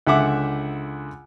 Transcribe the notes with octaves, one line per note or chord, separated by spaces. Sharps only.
C#2 D3 E5 F#5 D6